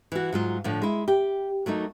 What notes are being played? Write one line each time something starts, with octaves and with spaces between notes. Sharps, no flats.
E3 F#4
G#2 F#3 F4
A2 D3 F3
G#3 E4
G4
F#3 A3 A#3 D#4